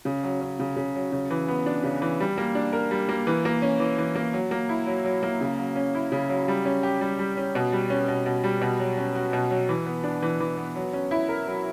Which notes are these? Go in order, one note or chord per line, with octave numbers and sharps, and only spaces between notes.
C#3
F#3
C#4
C#3
C#3
F#3
C#3
E3
B3
D4
C#3
E3
G3
A#3
D4
A#4
G3
A#3
E3
A#3
C#4
E3
E3
A#3
F#3
A#3
E4
F#3
F#3
A#3
C#3
F#3
C#4
E4
C#3
F#3
G3
C#4
G4
G3
G3
C#4
B2
G3
C#4
B2
B2
G3
B2
F#3
C#4
F#4
B2
F#3
E3
B3
D4
E3
E3
B3
F#3
C#4
E4
A#4
F#3